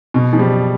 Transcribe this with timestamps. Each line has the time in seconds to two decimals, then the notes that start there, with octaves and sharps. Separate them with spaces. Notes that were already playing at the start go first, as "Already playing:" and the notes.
0.14 B2
0.33 F3
0.39 G3